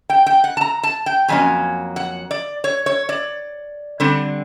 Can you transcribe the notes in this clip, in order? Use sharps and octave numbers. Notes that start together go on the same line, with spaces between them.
G5
G5
F#5
A5
A#5
A5
G5
F2 C#3 F#3 A#3 C#4 G#5
F#5
D5
C#5
C#5
D5
D3 G3 C4